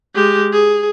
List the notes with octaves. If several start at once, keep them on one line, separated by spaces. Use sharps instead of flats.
G#3 G4
G#4